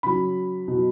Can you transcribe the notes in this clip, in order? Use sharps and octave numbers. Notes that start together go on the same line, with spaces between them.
C#3 F#3 B5
B2 F#3